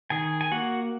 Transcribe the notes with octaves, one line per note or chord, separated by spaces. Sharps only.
D#3 G#4 G#5
G#5
A#3 F#4 F#5